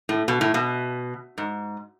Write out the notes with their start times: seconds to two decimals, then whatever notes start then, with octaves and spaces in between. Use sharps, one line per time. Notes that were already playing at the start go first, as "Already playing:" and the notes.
0.09 A2
0.28 B2
0.41 A2
0.54 B2
1.38 G#2